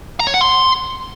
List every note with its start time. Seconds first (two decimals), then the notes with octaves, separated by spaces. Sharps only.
0.20 A#5
0.27 C#5
0.34 F#5
0.41 C6